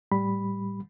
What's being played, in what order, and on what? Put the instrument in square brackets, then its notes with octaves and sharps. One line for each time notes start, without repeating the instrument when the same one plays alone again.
[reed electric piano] A2 G3 B5